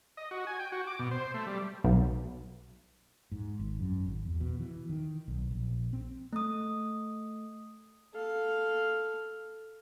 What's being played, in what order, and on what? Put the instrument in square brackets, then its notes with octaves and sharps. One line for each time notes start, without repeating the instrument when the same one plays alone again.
[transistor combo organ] D#5
F#4
G#5
G5
F#4
D6
B2
C5
A3
G3
[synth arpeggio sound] B1
[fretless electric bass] G#2
G#1
F#2
G#1
E2
B2
E3
D#3
B1
A#1
C4
[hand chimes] A3 D#6
[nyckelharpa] A4 F5